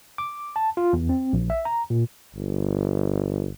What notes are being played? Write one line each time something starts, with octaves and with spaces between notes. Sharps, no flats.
D6
A5
F4
E2
C4
A#1
E5
A#5
A#2
G1